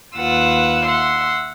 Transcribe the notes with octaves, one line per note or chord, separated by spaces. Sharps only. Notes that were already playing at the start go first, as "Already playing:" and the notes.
D#2 F4 B4 F#5 E6
E5 F#5 C6